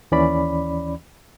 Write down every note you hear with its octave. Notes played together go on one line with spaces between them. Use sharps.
D#2 E3 C#4 D5 B5